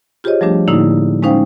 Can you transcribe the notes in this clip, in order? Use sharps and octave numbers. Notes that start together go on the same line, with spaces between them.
F4 G4 G#4 C5 C#5 D#5
F3 G3 A3 D4 G4
A2 D3 A#3 D#4 E4
G#3 C#4 D#4 C5 F5 G5